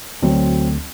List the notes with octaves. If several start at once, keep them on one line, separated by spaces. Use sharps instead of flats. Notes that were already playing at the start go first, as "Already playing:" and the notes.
D2 F#3 C4